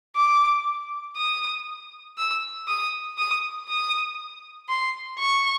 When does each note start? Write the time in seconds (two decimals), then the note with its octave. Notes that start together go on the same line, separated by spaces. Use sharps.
0.16 D6
1.17 D#6
2.18 E6
2.68 D#6
3.18 D#6
3.69 D#6
4.69 C6
5.19 C#6